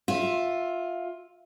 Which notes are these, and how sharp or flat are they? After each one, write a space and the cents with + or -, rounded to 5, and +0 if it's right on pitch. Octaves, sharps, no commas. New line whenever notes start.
F4 +15 E5 +0